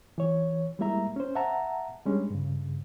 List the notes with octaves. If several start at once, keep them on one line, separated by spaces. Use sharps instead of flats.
E3 C#5
G3 G#3 A#3 E4 E5 A#5
C#4 C5
E5 F#5 A5 A#5
G3 G#3 C#4 D4
G2 C#3